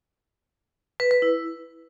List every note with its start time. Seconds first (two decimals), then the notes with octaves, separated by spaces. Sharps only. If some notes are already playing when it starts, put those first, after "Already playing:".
1.00 B4
1.11 B4
1.22 E4